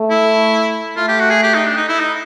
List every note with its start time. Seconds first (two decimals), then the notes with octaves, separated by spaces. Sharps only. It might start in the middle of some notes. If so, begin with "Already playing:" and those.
Already playing: A3
0.10 E4
0.96 A3 F4
1.08 G4
1.20 F#4
1.31 G#4
1.43 G4
1.54 D#4
1.66 D4
1.77 D#4
1.89 E4
2.00 D#4